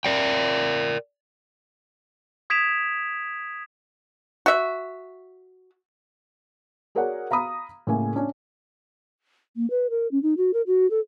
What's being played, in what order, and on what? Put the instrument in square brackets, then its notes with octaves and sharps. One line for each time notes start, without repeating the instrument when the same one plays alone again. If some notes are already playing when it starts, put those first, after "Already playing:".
[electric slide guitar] A#4 D5 G5
[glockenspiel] D#6 G#6 B6 D7 E7 F7
[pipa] F#4 E5
[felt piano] F#4 G#4 A#4 C#5 D5 F#5
F5 A#5 B5 D#6
A2 C#3 G#3 A#3 A#4 G#5
C#4 D4
[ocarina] A#3
B4
A#4
C#4
D#4
F#4
A#4
F#4
A4